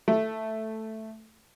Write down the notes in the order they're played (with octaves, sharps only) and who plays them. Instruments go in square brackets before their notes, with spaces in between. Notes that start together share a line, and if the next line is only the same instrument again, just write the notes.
[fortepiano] A3